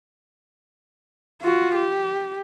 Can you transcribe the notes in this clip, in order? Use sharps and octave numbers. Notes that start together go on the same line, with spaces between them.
F4 F#4
G4